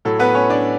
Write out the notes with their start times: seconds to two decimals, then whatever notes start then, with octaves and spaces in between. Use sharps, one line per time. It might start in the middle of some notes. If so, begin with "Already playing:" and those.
0.05 A2 F#3 A4
0.19 B3 B4
0.35 C#4 C#5
0.50 D4 D5